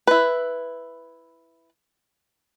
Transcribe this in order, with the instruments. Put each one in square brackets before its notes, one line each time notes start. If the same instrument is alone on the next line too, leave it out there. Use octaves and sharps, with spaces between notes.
[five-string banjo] E4 B4